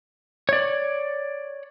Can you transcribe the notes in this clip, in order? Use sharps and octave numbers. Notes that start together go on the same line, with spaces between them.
C#5 D5